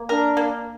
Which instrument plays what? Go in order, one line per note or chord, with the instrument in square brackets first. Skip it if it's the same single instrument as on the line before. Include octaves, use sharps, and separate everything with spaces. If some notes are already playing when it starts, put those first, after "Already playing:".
Already playing: [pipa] A#3
[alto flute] D4 [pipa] A#4
[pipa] A#3